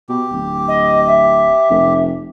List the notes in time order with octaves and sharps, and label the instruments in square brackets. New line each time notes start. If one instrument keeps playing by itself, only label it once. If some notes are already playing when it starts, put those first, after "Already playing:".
[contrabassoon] B2 [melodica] G4
[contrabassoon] D1
[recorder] D#5
E5
[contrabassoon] F1